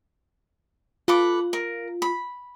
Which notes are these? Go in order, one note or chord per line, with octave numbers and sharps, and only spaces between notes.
F4 A4 B4 D6
A#4
B5